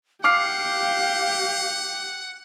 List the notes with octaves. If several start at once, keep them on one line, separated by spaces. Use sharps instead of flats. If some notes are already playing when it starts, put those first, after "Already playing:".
G4 F5 F#5 D6 F6 C7